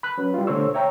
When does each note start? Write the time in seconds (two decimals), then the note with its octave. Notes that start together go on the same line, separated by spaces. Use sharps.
0.03 B5 F#6
0.18 F#3 C#4 B4
0.34 G3 E4 F4
0.47 B2 D3 A3 C5 C#5 E6
0.74 C#5 E5 G5 A#5